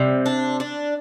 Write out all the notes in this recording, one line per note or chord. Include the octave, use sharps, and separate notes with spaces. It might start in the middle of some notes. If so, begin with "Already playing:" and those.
Already playing: C3 G3
D4
D4